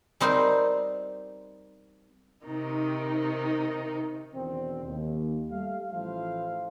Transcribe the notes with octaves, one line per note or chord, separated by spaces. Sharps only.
G3 C4 D#4 A#4 C5
C3 D#3 D#4
E2 B2 D3 D#3 C4
D#2
G3 A3 F5
A1 F3 E4 A4 C5 F5